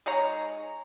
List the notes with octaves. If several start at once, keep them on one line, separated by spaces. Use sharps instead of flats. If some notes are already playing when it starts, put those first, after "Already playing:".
G#3 D#4 C#5 A#5